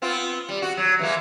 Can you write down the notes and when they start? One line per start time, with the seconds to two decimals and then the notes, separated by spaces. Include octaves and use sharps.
0.02 B3 C4 F4
0.49 G3
0.62 F#4
0.77 F#3
0.99 E3 G#3 A#3